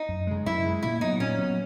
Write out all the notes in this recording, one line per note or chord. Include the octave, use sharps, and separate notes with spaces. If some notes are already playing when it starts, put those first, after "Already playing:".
Already playing: D#4
F#2
C#3 G#3
F#2 E4
C#3 G#3
A#2 E4
F#3 B3 D#4
A#2 C#4
F#3 B3